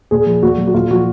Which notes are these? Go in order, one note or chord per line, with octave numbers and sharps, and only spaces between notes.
A#2 G#4
F3
A#2 F#4
F#3
F#4
A#2 F4
F3 F#4